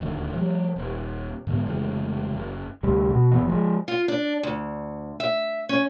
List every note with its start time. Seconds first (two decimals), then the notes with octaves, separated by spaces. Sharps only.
0.01 D1 D#2 D3
0.35 F3 G3
0.76 D#1
1.47 G#2 D3 G#3 B3
1.66 F1 C#3 E3 G#3
2.34 F#1
2.83 D2 C3 G3
3.11 B2
3.31 F1 E3 B3
3.47 F3 F#3 G#3
3.88 F4
4.08 D4
4.43 D2
5.20 E5
5.69 C#4